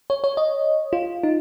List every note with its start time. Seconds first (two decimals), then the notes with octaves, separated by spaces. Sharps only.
0.10 C#5
0.24 C#5
0.37 D#5
0.93 F4
1.23 D#4